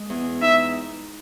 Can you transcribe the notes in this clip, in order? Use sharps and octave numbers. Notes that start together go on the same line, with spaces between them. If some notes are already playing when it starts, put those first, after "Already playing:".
Already playing: G#3
E2
D#4 E5